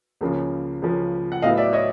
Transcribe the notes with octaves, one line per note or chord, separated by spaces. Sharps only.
C#2 C#3 F3 A#3 C#4
C#2 C#3 F3 A#3 C#4
F#5
A2 F#3 B3 E4 D#5 F5
D5 E5
C#5 D#5